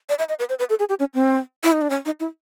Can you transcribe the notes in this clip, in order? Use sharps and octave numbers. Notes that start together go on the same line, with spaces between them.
D5
E5
D#5
B4
C5
B4
A4
G#4
G4
C#4
C4
E4
D#4
D4
C#4
D#4
E4